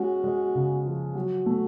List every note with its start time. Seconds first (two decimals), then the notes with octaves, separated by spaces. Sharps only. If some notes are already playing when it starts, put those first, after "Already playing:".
Already playing: G#3 C#4 F#4
0.24 G#3
0.55 C#3
0.85 F3
1.15 F#3 F#4
1.46 A3